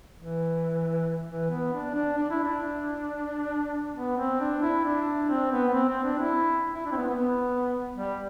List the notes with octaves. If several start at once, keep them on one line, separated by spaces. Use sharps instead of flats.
E3
E3
B3
D4
D4
D4
E4
D4
B3
C4
D4
E4
D4
C4
B3
B3
C4
C4
D4
E4
E4
D4
C4
B3
B3
G3